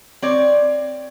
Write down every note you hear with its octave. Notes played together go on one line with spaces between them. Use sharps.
C4 C#5 D5